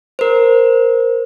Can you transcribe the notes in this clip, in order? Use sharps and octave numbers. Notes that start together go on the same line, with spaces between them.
A#4 C5